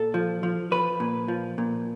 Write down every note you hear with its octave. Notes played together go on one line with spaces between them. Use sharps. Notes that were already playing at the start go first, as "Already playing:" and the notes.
Already playing: A#2 A4
F3
F3
F3 B4
A#2
F3
A#2